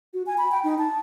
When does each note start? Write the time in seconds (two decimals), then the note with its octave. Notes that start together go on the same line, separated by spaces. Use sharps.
0.14 F#4
0.26 G#5
0.38 B5
0.52 G5
0.64 D#4
0.78 A5